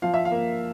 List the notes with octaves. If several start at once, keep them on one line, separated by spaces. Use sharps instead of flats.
F3 F5
E5
F5
A#3